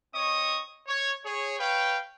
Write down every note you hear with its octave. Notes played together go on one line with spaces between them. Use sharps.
C4 C#5 D#5 C#6 D#6
C#5
G#4 C#5
B4 C#5 F5 G5